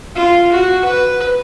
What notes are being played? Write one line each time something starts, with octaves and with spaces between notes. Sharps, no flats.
F4
F#4
B4